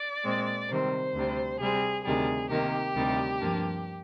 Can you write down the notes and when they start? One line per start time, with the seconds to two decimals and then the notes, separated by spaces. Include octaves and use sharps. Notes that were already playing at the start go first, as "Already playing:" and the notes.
Already playing: D5
0.24 A#2 G#3 C4
0.69 C3 D#3 G3 C4 C5
1.15 D2 C3 G3
1.60 C3 G3 C4 G#4
2.05 D2 C3 D#3 G3 G#4
2.50 C3 D#3 A#3 D#4 G4
2.96 D2 C3 D#3 G3
3.40 G2 F3 A#3 D4